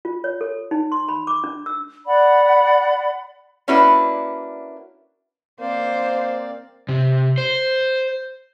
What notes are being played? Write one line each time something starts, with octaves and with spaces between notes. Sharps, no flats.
F4
C#5
A4
D#4
C6
B5
D6
D4
E6
D5 F#5 B5
A#3 C#4 D4 E4 F#4 B4
A#3 C4 C5 D5 F5
C3
C5